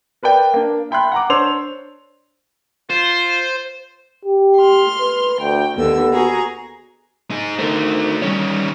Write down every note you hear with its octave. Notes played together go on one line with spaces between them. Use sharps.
A#4 B4 D5 G5
A#3 D4
E5 G5 B5 C6 F#6
F#5 A#5 D6
D4 C5 C#5 C6 E6 F7
F4 C5
G4
C6 F6
B4
D2 G5
D#2 D3 B3 E6
F#4 G#4 A#5
D#4 G#4
D3 A3 D#4 A#4 C5
D#3 G3 C#4 C#5